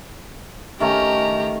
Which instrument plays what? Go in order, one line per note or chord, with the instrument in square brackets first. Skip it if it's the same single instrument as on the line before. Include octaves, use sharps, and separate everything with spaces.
[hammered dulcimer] D#3 A3 C#4 [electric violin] G4 A#5